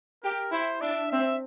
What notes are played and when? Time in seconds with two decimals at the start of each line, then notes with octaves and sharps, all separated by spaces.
0.24 G4 A#4
0.53 E4 C5
0.81 D4 E5
1.11 C4 E5